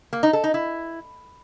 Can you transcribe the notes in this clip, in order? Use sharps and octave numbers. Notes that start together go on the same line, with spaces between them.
A#3
D#4
A4
D#4
E4